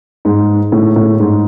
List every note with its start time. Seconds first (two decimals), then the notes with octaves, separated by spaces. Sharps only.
0.25 G#2
0.72 A2
0.96 A2
1.20 G#2